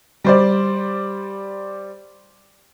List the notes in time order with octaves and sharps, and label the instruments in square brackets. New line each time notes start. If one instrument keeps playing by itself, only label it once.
[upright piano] G3 C5 D5